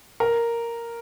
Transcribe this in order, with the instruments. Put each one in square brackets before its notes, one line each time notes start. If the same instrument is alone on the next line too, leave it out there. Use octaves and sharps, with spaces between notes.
[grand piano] A#4